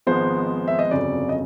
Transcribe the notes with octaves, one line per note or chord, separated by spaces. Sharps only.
G#1 G#2 F3 G#3 B3 C5
E5
D#5
G1 F2 C#3 F#3 D5
D#5